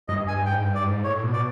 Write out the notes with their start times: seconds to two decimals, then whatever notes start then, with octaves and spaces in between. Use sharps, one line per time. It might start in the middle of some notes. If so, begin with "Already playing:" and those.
0.08 G2 D#5
0.27 G2 G#5
0.46 G#2 G5
0.65 G2
0.75 D5
0.84 G#2
1.04 A2 C#5
1.23 B2
1.33 D5